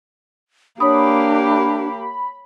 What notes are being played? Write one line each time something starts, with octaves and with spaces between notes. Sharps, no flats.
A#3 D4 G4 C#5 B5 D#6